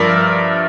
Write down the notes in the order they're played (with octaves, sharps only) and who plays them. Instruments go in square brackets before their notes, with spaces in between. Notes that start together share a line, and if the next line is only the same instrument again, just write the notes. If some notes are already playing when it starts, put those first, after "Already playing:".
Already playing: [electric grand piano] G2 F3 A#4 D5 E5